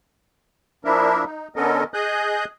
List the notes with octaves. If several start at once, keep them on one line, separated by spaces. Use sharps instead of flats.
F3 A#3 D4 E4 A#4 E5
D#4
D3 B3 C#4 A4 A#4 D#5
G#4 D#5 G#5 D#6 F#6 G6